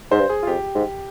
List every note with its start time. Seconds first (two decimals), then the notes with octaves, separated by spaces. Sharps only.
0.11 G#2 C5
0.21 G2
0.29 G#4
0.43 F4
0.47 F2 G4
0.75 G#2